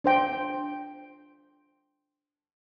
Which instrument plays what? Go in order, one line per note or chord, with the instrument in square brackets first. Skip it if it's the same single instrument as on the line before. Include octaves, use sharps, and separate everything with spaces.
[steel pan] D4 C5 G5